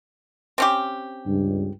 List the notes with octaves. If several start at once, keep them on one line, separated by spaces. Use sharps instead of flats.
C4 C#4 G4
C#2 G2